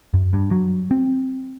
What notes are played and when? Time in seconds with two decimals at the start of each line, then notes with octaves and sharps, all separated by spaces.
0.14 F#2
0.33 G2
0.51 F#3
0.91 C4